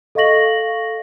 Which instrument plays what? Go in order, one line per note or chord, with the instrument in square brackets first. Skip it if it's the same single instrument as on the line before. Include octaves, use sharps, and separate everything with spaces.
[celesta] A4 D#5 F5 C#6 A#6 F#7